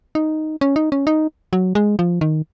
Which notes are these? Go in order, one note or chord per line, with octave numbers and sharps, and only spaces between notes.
D#4
C#4
D#4
C#4
D#4
F#3
G#3
F3
D#3